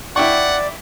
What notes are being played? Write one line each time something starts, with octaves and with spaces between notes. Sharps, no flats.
E4 D5 F#5 G5 C#6